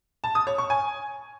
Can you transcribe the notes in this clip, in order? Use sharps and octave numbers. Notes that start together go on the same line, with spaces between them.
A5
D#6
C#5
C#6
G#5